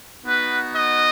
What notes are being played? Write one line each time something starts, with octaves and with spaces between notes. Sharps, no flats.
B3 D#4 F#4 B4
D#5